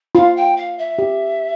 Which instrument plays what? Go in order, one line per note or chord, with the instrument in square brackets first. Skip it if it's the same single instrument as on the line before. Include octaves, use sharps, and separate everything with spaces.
[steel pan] F4 [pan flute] F5
[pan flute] G5
F5
E5
[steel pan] G4